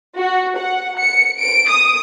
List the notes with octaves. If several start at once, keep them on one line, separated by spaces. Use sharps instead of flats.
F#4
F#5
C#7
D7
D#6